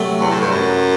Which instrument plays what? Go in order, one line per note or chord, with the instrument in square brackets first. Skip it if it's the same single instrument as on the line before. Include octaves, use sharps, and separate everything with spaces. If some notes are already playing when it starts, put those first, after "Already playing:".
Already playing: [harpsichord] C3 F#3 A3
[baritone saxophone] E2
A2
G2
F#2